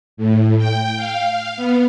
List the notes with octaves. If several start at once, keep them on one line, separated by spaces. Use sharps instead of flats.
A2
G5
F5
B3